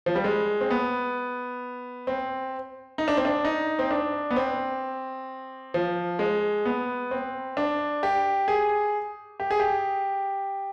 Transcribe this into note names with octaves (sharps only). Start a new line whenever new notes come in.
F3
G3
G#3
C4
B3
C4
D#4
D4
C4
D4
D#4
C4
D4
B3
C4
F3
G#3
B3
C4
D4
G4
G#4
G4
G#4
G4